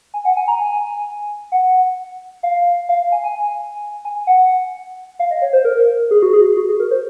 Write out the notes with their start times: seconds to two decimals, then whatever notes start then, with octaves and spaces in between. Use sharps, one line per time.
0.14 G#5
0.25 F#5
0.37 G#5
0.48 A#5
0.59 G#5
1.52 F#5
2.43 F5
2.89 F5
3.12 G#5
3.24 G#5
4.05 G#5
4.27 F#5
5.19 F5
5.31 D#5
5.42 C#5
5.53 C5
5.65 A#4
6.11 G#4
6.23 F#4
6.33 G#4
6.57 F#4
6.69 G#4
6.80 A#4
6.91 C5